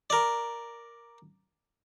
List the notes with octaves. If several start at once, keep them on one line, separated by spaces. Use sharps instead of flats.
A#4 D5